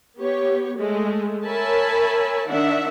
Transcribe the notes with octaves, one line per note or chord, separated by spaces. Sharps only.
B3 G4 C#5
G#3 A3
A#4 C#5 E5 G#5 A5 B5
D#3 D4 E5 F#5